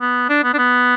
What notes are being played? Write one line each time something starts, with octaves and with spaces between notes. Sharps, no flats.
B3
D4
B3
D4
B3